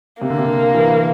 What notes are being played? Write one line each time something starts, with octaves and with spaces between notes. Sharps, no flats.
C3 A#3
D3
C3
D3
E3